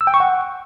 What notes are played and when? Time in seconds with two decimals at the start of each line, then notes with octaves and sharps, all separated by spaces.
0.01 E6
0.07 G5
0.14 C#6
0.20 F#5